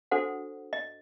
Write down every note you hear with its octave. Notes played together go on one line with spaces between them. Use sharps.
D4 F#4 A4 C5 F#5
D#5